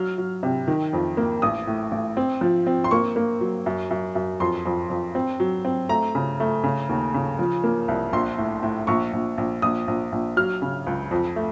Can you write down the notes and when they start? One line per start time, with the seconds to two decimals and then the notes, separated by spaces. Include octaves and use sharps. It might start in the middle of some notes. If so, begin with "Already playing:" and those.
Already playing: F#3 F6
0.18 F#3
0.43 C3
0.68 D#3
0.93 F2
1.17 A#3
1.42 A1 D#6
1.67 A2
1.91 A1
2.17 C4
2.41 F3
2.67 C4
2.84 C6
2.91 A#3 C#6
3.16 A#3
3.41 F#3
3.66 F#2
3.91 F#2
4.15 F#2
4.40 F2 C6
4.66 F2
4.90 F2
5.15 C4
5.40 F#3
5.65 C4
5.89 A3 A#5
6.15 C#3
6.40 A3
6.64 C#3
6.89 D#2
7.14 C#3
7.39 F3
7.64 A#3
7.88 C2
8.13 A#1 C6
8.38 A2
8.63 A2
8.87 A#1 C#6
9.13 A#1
9.38 A#1
9.62 A#1 D#6
9.88 A#1
10.12 A#1
10.36 F#3 F6
10.62 C#3
10.87 C#2
11.11 F2
11.36 A3